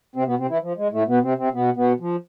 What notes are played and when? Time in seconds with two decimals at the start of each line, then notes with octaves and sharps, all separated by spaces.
0.16 C3 C4
0.27 B2 B3
0.39 C3 C4
0.50 E3 E4
0.62 F3
0.77 G#3
0.92 A2 A3
1.08 B2 B3
1.23 C3 C4
1.38 C3 C4
1.54 B2 B3
1.76 B2 B3
2.00 F3